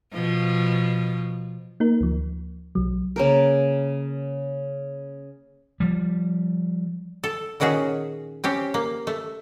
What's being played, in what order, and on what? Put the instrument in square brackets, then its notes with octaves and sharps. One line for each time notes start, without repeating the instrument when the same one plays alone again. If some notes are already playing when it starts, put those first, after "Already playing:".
[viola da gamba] B2 F3
[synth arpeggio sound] A#3 D#4 A#4
D2 F3
B1 F#3
[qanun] C#3 A#3 A#4
[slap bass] F3 G3
[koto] A4
A#2 D#3 C#4 F#4 G#4
C4 C#4 G4
A#3
A3